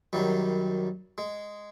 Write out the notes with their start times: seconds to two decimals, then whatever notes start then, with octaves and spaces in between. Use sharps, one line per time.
0.13 F#2 D#3 F#3 G3
1.18 G#3